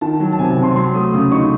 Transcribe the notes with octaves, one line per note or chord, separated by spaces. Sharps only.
D#3 A5
F#3
A5
C3 G#5
A5
C3
C6
F#3 C6
A3 D#6
C#3 D#6
D#4 C#6